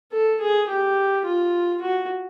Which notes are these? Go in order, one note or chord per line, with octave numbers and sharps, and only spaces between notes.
A4
G#4
G4
F4
F#4